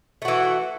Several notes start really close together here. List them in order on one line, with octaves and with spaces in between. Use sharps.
A3 F#4 E3